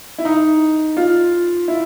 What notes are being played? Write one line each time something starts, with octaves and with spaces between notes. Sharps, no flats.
E4
D#4
F4
E4